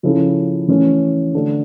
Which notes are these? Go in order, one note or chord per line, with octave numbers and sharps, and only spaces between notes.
C#3 F3 C#4 E4 A4
E3 A3 C#4
D3 A3 D4 A4